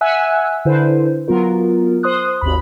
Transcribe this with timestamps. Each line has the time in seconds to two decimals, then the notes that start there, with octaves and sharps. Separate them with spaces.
0.01 E5 F#5 G#5 E6 F#6
0.65 D3 E4 B4 C5
1.28 F#3 B3 F4 A#4
2.03 C5 C6 D#6 F#6
2.41 G#1 D#2 B5